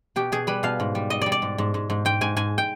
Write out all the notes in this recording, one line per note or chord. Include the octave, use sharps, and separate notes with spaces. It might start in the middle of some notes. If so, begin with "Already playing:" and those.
B2 G4
B2 G#4
G3 B4
B2 F5
G#2
G3
G3 D#5
G3 D5
D5
G#2
G#2
G#2
G#2
G#2 G5
G#2 G#5
G#2 G#5
G5